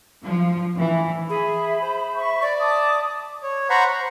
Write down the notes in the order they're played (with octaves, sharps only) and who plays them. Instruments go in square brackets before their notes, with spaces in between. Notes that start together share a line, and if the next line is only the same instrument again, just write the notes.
[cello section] F3
E3
[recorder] G#4 [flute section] E5 [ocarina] B5
[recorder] C5
[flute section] E5 C#6
[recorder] D5
[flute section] A5 D6 [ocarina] D#6
[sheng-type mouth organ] C#5
C5 F#5 A#5 B5 C#6
A#5